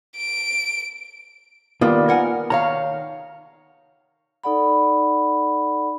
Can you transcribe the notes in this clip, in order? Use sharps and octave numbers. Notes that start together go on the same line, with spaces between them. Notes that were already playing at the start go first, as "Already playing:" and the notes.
D7
D#3 G3 A#3 B3 F4
A#4 F#5 G#5
D#3 C#5 F5 A#5
D#4 A4 D5 F#5 B5